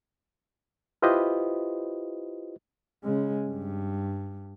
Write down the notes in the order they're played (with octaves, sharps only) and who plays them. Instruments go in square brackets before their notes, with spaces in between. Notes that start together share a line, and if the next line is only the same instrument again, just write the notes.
[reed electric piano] E4 F4 G4 B4 C5 D#5
[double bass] C#3 G#3
G2